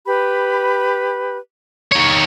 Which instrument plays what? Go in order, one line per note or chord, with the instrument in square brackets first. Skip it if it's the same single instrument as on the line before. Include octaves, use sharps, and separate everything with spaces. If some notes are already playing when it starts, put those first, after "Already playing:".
[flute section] G4 B4 B5
[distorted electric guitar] D#3 C#5